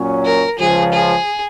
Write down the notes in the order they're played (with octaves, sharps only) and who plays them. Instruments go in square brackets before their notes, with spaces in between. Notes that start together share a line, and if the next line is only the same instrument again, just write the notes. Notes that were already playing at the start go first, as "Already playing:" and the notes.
Already playing: [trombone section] A#2 F#3 C#4
[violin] A#4
[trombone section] C#2 C#3 F3 [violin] G#4
[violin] G#4